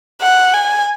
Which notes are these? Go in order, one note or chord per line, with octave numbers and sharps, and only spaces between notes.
F#5
G#5